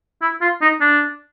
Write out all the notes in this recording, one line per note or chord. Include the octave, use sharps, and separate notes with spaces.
E4
F4
D#4
D4